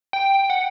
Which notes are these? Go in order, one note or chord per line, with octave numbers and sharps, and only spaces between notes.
G5
F#5